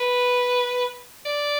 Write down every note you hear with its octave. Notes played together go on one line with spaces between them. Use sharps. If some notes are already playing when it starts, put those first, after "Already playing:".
Already playing: B4
D5